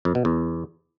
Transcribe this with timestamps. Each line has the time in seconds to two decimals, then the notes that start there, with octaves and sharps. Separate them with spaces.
0.05 F2
0.15 B2
0.25 E2